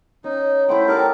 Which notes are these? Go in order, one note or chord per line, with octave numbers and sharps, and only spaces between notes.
C#4 D#4
A3 E4 C5 F#5 G5
D#4 G4 A4 A#4 D5